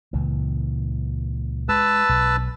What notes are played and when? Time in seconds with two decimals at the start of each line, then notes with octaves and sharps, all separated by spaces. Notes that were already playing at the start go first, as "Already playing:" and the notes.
0.13 C#2 A#2 E3
1.69 G#3 B4 A5 E6
2.09 B1